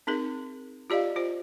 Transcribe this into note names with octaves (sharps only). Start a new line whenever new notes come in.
C4 D#4 G#4 A#4
F4 G4 D5 D#5 F5
F4 C5